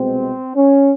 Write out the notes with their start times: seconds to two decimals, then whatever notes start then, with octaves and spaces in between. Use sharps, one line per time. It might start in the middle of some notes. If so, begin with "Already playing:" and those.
Already playing: C2 B2 G#3 C4
0.56 C#4